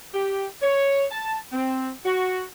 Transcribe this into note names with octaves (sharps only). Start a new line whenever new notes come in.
G4
C#5
A5
C4
F#4